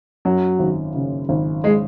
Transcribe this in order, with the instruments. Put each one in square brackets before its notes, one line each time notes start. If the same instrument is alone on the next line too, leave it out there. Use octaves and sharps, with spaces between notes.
[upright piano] F#2 [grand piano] F#3
[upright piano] G#1
C#3
G#1
[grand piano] G#3